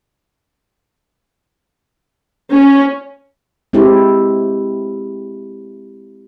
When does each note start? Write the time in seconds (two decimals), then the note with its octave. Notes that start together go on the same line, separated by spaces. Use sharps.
2.51 C#4
3.73 G#3 C4 E4 G4